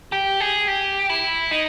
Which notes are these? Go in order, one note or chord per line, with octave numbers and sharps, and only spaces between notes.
G4
G#4
G4
E4
D#4